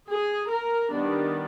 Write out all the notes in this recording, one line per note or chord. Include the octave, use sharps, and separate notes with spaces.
G#4
A#4
D#3 G3 B3 D4